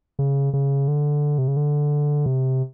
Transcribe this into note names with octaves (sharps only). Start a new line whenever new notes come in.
C#3
C#3
D3
C3
C#3
D3
C3